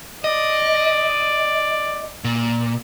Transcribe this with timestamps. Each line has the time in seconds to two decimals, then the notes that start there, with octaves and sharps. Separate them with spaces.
0.24 D5 D#5
2.24 A#2